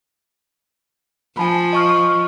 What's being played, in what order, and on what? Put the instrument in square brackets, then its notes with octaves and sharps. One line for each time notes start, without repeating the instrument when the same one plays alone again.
[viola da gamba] F3 [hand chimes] G#5 A5 B5
[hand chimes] D#5 C#6 F6